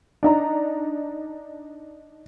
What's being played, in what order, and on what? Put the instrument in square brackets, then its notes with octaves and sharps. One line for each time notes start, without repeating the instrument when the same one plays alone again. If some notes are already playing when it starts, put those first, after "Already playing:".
[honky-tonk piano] D4 D#4 A#5